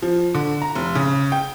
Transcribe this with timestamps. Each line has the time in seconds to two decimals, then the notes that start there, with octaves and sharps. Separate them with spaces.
0.02 F3
0.34 D3
0.62 A#5
0.75 F1
0.95 C#3
1.32 G5